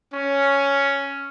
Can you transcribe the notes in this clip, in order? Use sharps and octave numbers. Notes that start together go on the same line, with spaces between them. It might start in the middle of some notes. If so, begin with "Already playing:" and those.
C#4